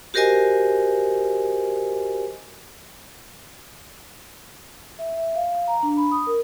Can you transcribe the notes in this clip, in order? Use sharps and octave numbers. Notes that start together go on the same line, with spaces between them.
F#4 G4 A#4 C5 D#5 G#5
E5
E5
F5
F5
A#5
D4
B5
D#6
A#4